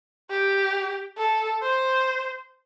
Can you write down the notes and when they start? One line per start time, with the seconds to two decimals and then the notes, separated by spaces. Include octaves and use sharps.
0.30 G4
1.18 A4
1.62 C5